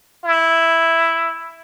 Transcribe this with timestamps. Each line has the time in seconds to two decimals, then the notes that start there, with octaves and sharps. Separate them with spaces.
0.24 E4